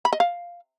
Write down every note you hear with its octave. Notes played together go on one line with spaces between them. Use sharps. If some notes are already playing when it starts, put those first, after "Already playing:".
B5
D#5
F5